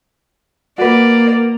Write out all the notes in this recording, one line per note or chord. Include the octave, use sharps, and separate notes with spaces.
A#3 F#4 B4 D5